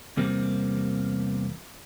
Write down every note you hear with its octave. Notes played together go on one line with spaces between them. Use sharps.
E2 C3 G3 A#3 C4